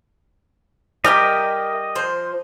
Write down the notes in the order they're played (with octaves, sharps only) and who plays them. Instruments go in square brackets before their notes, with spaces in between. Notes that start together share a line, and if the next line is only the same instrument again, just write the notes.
[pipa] G3 G4 [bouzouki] A#4 E5 G#5 [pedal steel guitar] D#5
[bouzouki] F3 C5